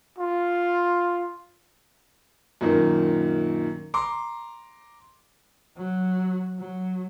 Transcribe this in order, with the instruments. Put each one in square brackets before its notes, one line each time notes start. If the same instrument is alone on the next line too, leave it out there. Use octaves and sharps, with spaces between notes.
[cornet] F4
[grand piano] F#2 A#2 D#3 A#3
A#5 C6 D6
[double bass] F#3
F#3